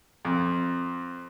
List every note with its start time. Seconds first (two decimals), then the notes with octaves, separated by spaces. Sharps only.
0.25 F2